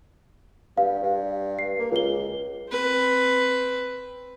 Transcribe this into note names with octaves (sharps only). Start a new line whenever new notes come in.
G2 F5
G2
C7
A#3
C#2 F4 G7
C4 B4